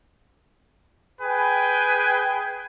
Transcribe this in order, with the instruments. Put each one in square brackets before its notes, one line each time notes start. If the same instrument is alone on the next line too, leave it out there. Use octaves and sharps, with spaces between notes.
[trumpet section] G#4 B4 G5 G#5